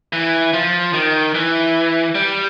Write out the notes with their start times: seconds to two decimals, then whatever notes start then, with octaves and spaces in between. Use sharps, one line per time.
0.13 E3
0.53 F3
0.94 D#3
1.34 E3
2.15 G3